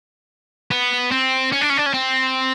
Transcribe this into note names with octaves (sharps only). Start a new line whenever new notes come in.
B3
C4
C#4
D4
C#4
D4
C#4
C4